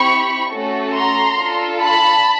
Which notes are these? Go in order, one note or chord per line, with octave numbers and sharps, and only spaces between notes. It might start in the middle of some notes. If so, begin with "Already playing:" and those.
Already playing: C4 E4 G4 B5 C#6
A3 C#4 F#4 A4
A#5 C6
D4 F4 A4
A5 B5